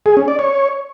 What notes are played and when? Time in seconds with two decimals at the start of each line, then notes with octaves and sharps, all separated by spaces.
0.06 G#4
0.17 C#4
0.28 D5
0.39 C#5